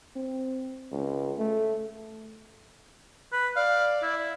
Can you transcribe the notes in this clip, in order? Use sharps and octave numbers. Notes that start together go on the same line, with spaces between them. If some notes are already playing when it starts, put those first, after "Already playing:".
C4
C#2
A3
B4
D5 F5
E4